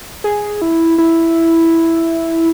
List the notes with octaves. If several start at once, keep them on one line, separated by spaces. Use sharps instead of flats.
G#4
E4
E4